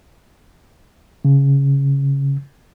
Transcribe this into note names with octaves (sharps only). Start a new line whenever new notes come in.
C#3